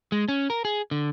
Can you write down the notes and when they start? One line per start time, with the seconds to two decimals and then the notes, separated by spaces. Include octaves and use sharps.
0.12 G#3
0.28 C#4
0.50 A#4
0.65 G#4
0.91 D3